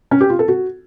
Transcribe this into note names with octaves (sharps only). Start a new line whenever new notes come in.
C#4
G4
F4
A4
F#4